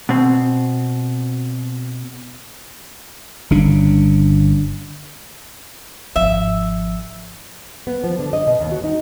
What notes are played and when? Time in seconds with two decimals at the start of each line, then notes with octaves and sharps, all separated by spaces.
0.09 B2 C4
3.50 G1 C#3 D4
6.16 G#1 F3 E5
7.87 B3
8.04 F3
8.19 D3
8.33 D#5
8.47 B2
8.60 D#2
8.72 F#4
8.84 D#4